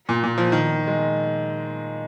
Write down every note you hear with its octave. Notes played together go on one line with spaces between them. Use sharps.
A#2
A#2
F3
D#3
G#3